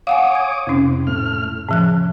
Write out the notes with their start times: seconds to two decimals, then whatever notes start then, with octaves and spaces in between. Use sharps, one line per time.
0.07 C#5 F5 F#5 G#5 D6 D#6
0.35 G#6
0.67 F2 C3 C#4
1.07 A2 F6
1.69 A2 C#3 F3 F#6